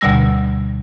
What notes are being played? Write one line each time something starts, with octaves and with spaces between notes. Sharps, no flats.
D2 B2 D3 G3 E6 A#6